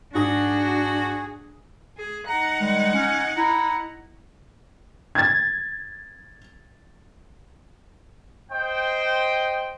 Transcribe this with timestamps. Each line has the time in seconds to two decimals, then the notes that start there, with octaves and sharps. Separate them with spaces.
0.15 G#2 D4 F#4 G#4 D#6 A#6
1.97 G#4
2.27 D#4 F#5 A#5
2.60 D#3 G3 G#3
2.94 C#4
3.38 E4 A#5
5.15 G#6 A6
8.52 C5 D#5 G5